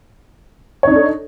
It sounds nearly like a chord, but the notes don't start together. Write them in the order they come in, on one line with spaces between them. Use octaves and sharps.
C#5 D#4 D4 A4